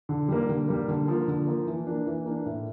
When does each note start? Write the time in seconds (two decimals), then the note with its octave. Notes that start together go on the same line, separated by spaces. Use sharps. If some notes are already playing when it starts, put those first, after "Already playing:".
0.09 D3
0.29 G3 A#3
0.49 D3
0.68 G3 A#3
0.88 D3
1.08 F3 A#3
1.28 D3
1.47 F3 A#3
1.67 E3
1.86 A#3 D4
2.06 E3
2.26 A#3 D4
2.46 A2